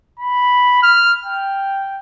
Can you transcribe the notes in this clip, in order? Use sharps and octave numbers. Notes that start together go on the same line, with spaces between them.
B5
F6
G5